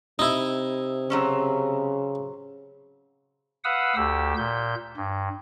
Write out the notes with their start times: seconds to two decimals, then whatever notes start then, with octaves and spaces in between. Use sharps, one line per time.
0.19 C3 D#4 E4
1.10 C#3 F#3 C4 C#4
3.64 B4 F5 F#5 D#6 E6
3.96 D2 G4 E6
4.37 A#2 G6
4.97 G2